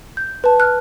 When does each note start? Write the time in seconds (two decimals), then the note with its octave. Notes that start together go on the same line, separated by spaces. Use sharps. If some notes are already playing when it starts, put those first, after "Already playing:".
0.17 G6
0.44 B4 A5
0.60 F6 F#6